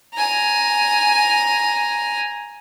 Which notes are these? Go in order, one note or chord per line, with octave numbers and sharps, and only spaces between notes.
G#5 A#5